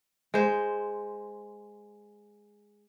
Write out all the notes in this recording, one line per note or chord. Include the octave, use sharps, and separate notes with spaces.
G#3 C5